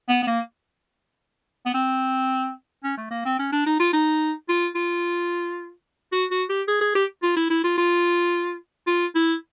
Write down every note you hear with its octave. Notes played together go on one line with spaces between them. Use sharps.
B3
B3
A#3
B3
C4
C#4
A3
A#3
C4
C#4
D4
D#4
F4
D#4
F4
F4
F#4
F#4
G4
G#4
G#4
G4
F4
E4
E4
F4
F4
F4
E4